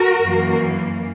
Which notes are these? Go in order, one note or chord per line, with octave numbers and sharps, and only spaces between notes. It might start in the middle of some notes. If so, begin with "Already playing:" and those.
Already playing: F#4 A#4
F#2 E3 A#3